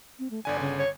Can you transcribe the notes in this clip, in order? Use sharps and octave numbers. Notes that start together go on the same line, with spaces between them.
C4
A3
G1 D3 D5 G#5
C#3
C#5